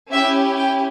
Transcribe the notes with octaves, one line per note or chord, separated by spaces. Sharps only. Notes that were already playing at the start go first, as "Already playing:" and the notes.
C#4 E4 G4 E5
G5